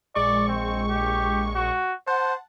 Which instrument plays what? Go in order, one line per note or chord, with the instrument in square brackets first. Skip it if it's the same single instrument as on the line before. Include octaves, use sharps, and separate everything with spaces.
[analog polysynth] A#1 G#3 C#6 [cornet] D5
[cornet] C4
G4
F#4
[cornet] C5 [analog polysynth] F#5 A5